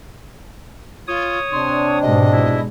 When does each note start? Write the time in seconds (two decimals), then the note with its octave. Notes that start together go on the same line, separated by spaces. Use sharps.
1.08 F4 C#5 D#6
1.52 C3 D4 C6
2.01 G#2 B2 G#3 D#5
2.32 E4